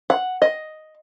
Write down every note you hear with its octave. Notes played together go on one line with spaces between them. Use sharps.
F#5
D#5